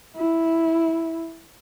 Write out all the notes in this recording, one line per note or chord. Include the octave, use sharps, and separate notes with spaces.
E4